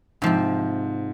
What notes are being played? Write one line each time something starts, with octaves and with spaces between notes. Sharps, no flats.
G#2 C3 F3 C4